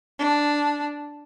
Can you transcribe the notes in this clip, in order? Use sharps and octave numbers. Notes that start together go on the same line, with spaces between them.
D4